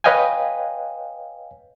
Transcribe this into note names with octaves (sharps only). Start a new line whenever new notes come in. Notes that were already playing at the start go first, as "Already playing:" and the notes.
B4 C#5 D#5 F5 G5 G#5